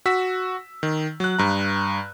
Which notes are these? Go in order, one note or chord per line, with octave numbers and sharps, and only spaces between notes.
F#4 E6 B6
D#3
F#3 F#6
G2 A#5